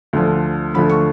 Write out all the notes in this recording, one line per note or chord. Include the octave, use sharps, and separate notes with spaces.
D2 D3 F3
D2 D3 F3 B5
C#6